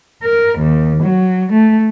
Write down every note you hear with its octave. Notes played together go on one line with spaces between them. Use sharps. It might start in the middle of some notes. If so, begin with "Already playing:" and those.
A#4
D#2
F#3
A3